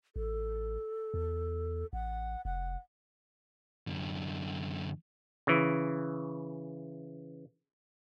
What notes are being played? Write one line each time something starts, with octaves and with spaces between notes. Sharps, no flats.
A1 A4
E2
A1 F#5
F1 F#5
F#2 D3
C#3 E3